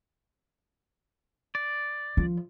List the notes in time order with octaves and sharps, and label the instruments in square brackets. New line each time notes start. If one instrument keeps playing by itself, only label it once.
[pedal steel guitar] D5
[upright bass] F3